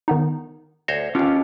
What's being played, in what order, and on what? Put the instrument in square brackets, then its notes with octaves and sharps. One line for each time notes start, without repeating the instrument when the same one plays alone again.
[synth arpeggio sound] D#3 B3 D#4
[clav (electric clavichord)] D2 C5 C#5 [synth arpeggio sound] A#6
[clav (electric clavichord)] D#2 D3 [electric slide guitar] C#4 F4 G4